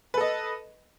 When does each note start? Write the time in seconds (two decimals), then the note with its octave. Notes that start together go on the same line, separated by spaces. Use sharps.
0.14 B4
0.17 A4
0.21 D#5